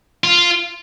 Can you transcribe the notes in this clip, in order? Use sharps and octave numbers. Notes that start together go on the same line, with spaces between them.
F4